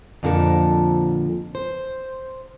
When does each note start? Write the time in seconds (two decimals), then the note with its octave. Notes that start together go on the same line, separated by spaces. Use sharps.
0.23 F2 A#2 D3 F3 A4 A#4
1.55 C5